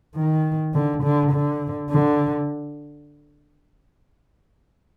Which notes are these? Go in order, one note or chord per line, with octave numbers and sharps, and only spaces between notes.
D#3
D3
D3
D3
D3